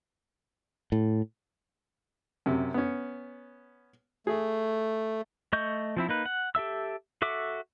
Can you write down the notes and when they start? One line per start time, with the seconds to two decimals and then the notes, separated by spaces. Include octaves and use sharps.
0.92 A2
2.46 F#2 C3
2.74 B3 C#4
4.27 A3 G#4
5.53 A3 D#5 C#6 G6
5.97 F3 C4 E4
6.09 A#3 D#4 B4
6.25 F#5
6.55 G4 A4 E5 E6
7.22 F#4 A4 E5 D6